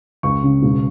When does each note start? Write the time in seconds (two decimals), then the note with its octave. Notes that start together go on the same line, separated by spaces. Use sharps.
0.23 C#2 C#6
0.43 C#3
0.63 E1